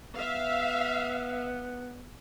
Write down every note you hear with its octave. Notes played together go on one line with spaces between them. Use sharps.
B3 E5 F5